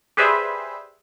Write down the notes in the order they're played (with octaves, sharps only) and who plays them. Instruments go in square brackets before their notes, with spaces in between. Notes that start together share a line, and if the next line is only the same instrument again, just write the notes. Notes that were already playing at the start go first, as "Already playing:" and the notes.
[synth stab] G4 G#4 B4 C5 D5 E5